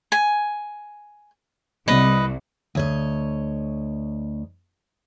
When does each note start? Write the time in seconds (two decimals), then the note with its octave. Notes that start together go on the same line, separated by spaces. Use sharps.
0.12 G#5
1.88 C2 B4 D#5
2.75 D2 C#5 D#5